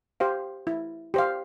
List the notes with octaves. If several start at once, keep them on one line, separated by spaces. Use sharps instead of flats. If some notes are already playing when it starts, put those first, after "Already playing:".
G4 C5 F5
E4
G4 C5 F5